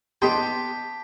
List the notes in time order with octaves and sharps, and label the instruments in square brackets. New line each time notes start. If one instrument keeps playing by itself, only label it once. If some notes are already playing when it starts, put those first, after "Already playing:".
[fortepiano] B3 D#5 C6 [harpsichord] G4 [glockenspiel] A5 B6